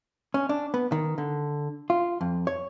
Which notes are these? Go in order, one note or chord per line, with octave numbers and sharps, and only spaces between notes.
C#4
D4
B3
D#3
D3
F4
F2
C#5